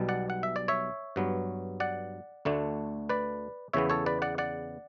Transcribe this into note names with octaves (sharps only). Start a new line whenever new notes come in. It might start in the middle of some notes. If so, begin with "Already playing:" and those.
Already playing: B1 B2 G3
D5 F#5
F#5
E5
D5
C#5 E5
G2 F#3 B3
D5 F#5
D2 D3 A3 D4
B4 D5
E2 C#3 E3 B3 C#5 E5
A4 C#5
B4 D5
D5 F#5
D5 F#5